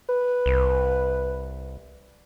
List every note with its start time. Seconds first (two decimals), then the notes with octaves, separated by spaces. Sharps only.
0.09 B4
0.46 C2